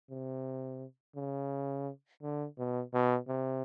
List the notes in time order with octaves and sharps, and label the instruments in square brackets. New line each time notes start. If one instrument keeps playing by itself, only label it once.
[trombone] C3
C#3
D3
B2
B2
C3